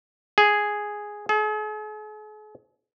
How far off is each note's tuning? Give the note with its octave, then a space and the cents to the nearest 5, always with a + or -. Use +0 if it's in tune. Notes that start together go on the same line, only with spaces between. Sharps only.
G#4 +0
G#4 +45